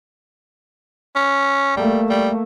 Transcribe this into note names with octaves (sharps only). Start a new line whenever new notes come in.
C#4
G3 A3 A#3
G3